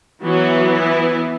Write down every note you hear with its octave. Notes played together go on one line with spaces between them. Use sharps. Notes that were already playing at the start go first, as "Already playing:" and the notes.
E3 F#3 B3 F#4
E4